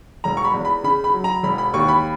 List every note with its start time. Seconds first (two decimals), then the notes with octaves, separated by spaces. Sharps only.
0.24 E1 A#5
0.37 C#6
0.44 B5
0.54 E2
0.65 B5
0.83 C#3 B5
1.04 B5
1.13 F#3
1.24 A#5
1.43 E1 B5
1.58 B5
1.74 D#2 C#6
1.88 B5